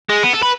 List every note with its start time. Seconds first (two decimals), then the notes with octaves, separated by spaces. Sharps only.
0.09 G#3
0.23 B3
0.33 A4
0.43 B4